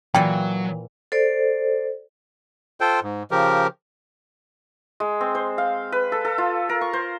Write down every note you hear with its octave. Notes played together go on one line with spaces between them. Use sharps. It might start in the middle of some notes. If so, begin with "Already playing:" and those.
A#2 E3 F#3 G5
A4 C5 D5
F4 A4 C5 G5
G#2
C#3 F3 G4 A#4
G#3
C4
C5
F5
B4
A4
A4
F4
A#4
C#6
C5